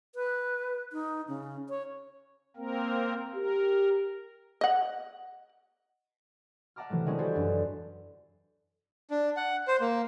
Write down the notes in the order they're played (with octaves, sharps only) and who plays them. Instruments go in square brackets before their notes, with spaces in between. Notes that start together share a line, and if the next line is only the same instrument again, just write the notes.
[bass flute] B4
D#4
C#3
C#5
[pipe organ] A#3 C4 A#4
[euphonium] G4 [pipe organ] A#4
[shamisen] D#5 F#5
[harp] E5 F#5 A5 A#5 D6 F6
C3 E3 F#3 A3
D#3 G3 G#3 C4 C#4 E4
F#4 G4 A4 B4 C5 G#5
F#2 D4 E4
A5
[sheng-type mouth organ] D4
F#5
C5
A#3